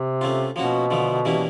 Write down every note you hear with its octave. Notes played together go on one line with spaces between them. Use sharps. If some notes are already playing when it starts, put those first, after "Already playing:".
Already playing: C3
A3 C#4 F4
B2 F3 A#3 C#4 F#4
D3 F3 A3
E3 G3 A#3 C#4 E4